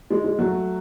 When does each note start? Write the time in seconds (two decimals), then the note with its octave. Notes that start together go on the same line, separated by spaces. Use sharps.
0.10 G#3
0.24 G#3
0.39 F#3 A3